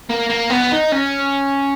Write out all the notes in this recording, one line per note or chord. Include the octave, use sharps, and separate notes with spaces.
A#3
A#3
B3
D#4
C#4